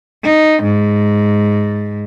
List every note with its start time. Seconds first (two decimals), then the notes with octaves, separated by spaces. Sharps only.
0.23 D#4
0.63 G#2